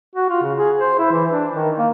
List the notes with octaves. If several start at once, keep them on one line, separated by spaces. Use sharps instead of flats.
F#4
F4
C#3
G#4
C5
E4
E3
D4
D#3
A#3